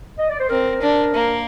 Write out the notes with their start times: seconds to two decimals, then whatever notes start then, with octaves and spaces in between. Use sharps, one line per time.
0.19 D#5
0.29 D5
0.40 C5
0.50 C4 A#4
0.82 D4
1.14 A#3